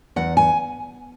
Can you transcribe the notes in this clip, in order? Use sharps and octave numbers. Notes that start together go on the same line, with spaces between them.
E2 F#5
G#5